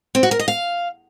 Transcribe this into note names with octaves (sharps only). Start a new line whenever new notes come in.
C4
F#4
A#4
D#5
F5